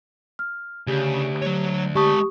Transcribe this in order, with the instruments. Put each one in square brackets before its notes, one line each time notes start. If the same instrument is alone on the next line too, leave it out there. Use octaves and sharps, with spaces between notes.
[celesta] F6
[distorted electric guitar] D2 [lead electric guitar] C#3 [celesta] G4
[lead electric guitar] F#3 C#5
[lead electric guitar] G#3 A5 [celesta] G4 C#6 D#6